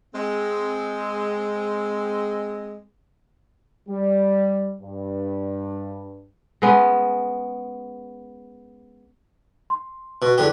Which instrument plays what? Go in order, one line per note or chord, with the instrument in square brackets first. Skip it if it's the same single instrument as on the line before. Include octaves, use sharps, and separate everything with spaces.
[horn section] G#3 C4
[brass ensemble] G3
G2
[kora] G#3 B3 C#4
[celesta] C6
[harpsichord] B2
E2 D3 G4